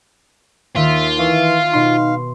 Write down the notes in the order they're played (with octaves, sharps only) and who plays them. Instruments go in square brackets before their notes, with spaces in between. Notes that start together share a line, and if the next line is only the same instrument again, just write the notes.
[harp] D#2 D#3 [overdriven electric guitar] F4 [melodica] E5
[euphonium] E3 [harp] E5 C#6 [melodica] F5
[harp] B2 C6 [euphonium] D#4